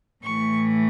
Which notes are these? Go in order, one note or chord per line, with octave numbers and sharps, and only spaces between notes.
A2 E3 A3 C#6